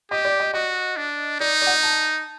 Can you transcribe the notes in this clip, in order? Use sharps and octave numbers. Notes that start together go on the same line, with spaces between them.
G4 D#5
D5
D#5
F#4 D#5
D4
D#4 D5
D5
F#5
D#5
A5